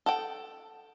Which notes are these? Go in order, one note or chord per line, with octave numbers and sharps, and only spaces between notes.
A4 F#5 G5